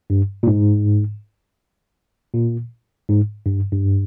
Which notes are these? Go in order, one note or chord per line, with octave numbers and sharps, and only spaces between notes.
G2
A#2
G#2
A#2
G#2
G2
G2